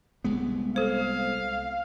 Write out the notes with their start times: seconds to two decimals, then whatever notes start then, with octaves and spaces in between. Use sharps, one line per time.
0.24 C2 G#3 B3
0.76 A4 C5 F5